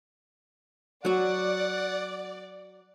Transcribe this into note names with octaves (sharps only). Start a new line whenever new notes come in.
F#3 F#4 D5 F#5